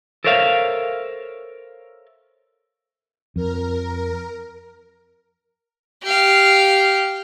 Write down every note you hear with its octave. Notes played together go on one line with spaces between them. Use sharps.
A4 A#4 C5 C#5 E5 F5
F2 A#4
G4 F5